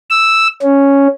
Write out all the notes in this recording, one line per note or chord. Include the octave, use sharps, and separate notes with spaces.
E6
C#4